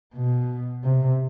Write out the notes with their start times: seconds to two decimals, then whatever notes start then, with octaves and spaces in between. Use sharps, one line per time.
0.14 B2
0.84 C3